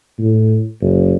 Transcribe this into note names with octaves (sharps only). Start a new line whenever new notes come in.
A2
F#1